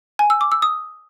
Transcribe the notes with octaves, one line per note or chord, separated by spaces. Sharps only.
G#5
E6
D6
E6
D#6